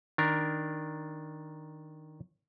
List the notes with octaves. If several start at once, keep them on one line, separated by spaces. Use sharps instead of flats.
D#3 D4 A#4